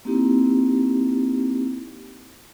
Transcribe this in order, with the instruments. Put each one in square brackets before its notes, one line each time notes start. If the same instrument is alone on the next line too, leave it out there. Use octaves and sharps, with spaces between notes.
[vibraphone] A#3 C4 D#4 E4 G4